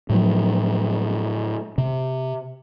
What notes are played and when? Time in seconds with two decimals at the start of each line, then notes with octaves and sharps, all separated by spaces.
0.10 A2 F3 F#3 A3
1.78 C3